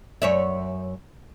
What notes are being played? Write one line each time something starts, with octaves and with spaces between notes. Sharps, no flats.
F#2 C#5 E5